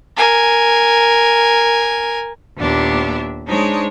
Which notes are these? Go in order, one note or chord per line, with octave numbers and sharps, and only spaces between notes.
A#4 G#5
D#2 A#2 B3 D4 G4 E5
G#3 D4 D#4 C5 C#5